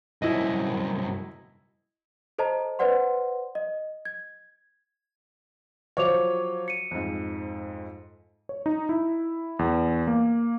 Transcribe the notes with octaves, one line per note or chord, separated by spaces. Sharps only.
C2 F#2 E4 D#5
A4 C5 D#5 A5 A#5
B4 C5 D5 F#5 C6
D#5
G#6
F3 F#3 C5 C#5 D6 F7
C#7 D#7
F2 G#2
C#5
D#4
E4
E2
A#3